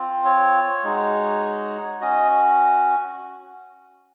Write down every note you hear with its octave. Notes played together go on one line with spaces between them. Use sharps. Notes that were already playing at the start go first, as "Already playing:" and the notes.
Already playing: C4 F4
C#5
G#3 D#4 F#4
C#4 F#4 D#5